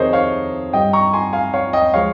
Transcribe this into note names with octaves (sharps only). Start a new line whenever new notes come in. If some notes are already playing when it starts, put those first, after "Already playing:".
Already playing: F2 C3 D#3 G#4 A#4 C5 C#5 D#5
C#5 F5
G2 G3 D#5 G5
A#5 C#6
G#5 C6
F5 G#5
C#5 F5
D#5 G5
C3 F3 G#3 C#5 F5